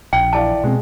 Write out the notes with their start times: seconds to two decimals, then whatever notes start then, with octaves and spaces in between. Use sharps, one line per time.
0.13 A#1 G5
0.33 E3 D5 F5 A5
0.64 B2 G#3 C4